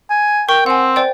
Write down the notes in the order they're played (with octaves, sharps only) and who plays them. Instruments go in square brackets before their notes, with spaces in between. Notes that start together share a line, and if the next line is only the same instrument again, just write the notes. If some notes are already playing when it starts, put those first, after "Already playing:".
[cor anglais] G#5
[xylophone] A#4 C#6 [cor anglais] G5
[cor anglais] C4 [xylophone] F#5 G#5
[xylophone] C5 D5 G5